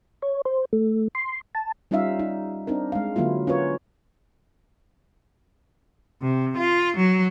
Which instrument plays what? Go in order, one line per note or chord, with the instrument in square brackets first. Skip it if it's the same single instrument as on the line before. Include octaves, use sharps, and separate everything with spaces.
[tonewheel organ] C#5
C5
A3
C6
A5
[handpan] G3 C#4 D#4 F4 E5 F5
D#4
C4 D4 D#4 A#4
G#3 F5
D3 F#3 A#3 E4 F4
C#4 F4 F#4 A#4 B4 C#5
[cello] C3
F4
F#3